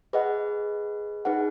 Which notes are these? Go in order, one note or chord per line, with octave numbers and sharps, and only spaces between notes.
G#4 B4 D#5 F#5
D#4 G#4 B4 F#5